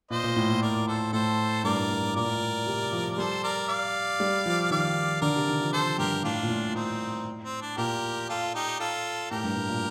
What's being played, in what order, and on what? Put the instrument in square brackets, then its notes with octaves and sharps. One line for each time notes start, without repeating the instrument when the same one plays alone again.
[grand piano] A#2 [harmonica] C5 D#5
[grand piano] A#2
A2
A#2
[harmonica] A#4 D5
A4 C5
[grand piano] A2 [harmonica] A4 C5
[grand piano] G2 [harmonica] A#4 D5
[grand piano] A2
A2
A2
[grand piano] A#2 [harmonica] A#4 D5
[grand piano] A2
A#2
C3
F3
[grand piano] G3 [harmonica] A4 C5
[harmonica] A#4 D5
D5 F5
[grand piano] G3
F3
[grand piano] D#3 [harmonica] D5 F5
[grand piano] D3 [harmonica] A#4 D5
[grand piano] C3
D#3
F3
[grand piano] F3 [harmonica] A4 C5
[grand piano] G2 [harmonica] G4 A#4
[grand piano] A2 [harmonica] D4 F4
[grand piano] A#2
A2
[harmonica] C4 D#4
C4
D4
[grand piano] A#2 [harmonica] G4 A#4
[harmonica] F4 A4
D#4 G4
F4 A4
[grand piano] A2 [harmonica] G4 A#4
[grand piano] G2
A2
A#2